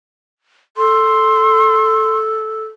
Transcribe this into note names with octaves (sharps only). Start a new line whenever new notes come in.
A4 C6